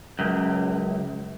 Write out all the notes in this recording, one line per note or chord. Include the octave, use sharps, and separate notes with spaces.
C#2 F#2